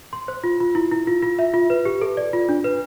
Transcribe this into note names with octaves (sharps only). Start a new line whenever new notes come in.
C6
C5
F4
F4
E4
E4
F4
F4
E5
F4
B4
G4
A4
D5
F4
D4
B4